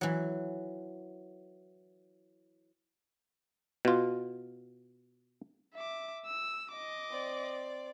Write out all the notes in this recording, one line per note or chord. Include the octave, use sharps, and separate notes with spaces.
E3 F#3
B2 F4
E5 D6
E6
D#5 D6
C4 D5